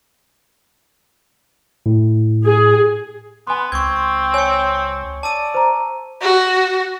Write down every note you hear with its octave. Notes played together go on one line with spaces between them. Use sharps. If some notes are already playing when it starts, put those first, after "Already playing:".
A2
G#4
B3 G#5 C6
C#2 C4 C#6 D6 G#6
C#5 G#5 C#7
D5 A5 E6 D#7
C5 A#5
F#4